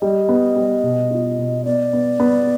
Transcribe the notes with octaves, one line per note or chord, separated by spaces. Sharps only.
G3 D#5
B3
G3
B2
F4
B2
B3 D5
B3
B3